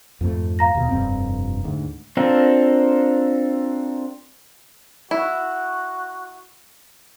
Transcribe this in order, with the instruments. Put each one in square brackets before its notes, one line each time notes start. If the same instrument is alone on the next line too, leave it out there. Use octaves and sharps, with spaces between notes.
[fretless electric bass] F2 G#2 A3
[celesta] F5 A#5 A#6
[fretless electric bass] D#2 B2
F1 G2 C4
D2 G#2
[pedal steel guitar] C4 D4 F4 A4 A#4
[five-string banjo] E4 [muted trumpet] F#4